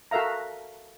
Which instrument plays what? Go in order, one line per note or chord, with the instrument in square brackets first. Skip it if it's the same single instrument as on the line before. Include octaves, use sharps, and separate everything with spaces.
[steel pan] F#4 A4 A#4 E5 F5 A#5